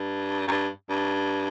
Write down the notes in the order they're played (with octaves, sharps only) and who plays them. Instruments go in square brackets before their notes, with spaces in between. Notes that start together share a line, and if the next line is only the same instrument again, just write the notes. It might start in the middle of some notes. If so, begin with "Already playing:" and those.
Already playing: [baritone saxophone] G2
F#2
G2
G2